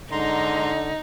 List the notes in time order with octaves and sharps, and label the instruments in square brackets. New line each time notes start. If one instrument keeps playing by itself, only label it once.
[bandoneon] G#2 A#5 C6 [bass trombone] D3 [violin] D#4